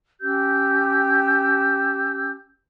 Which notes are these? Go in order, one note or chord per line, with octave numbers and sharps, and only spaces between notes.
C#4 G4 E6 G6